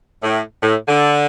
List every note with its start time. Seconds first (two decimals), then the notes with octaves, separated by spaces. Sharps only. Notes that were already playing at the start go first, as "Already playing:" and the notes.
0.22 A2
0.62 A2
0.88 D3